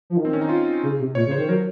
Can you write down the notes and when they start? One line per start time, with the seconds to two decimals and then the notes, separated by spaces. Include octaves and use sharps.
0.10 F3
0.17 D#3
0.25 C4
0.33 C#4
0.41 D#4
0.49 F4
0.83 C#3
0.99 C3
1.15 A#2 C#5
1.26 C#3
1.31 C5
1.37 D#3
1.48 F#3 A#4